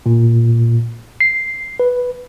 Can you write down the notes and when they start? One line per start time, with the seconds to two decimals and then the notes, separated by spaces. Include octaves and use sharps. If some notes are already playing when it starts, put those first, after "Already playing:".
0.06 A#2
1.21 C7
1.80 B4